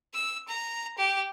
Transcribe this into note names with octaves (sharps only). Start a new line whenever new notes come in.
E6
A#5
G4